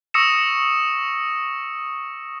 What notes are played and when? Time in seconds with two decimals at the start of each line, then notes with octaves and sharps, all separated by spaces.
0.14 C#6 D#6 E6 A#6 C#7 E7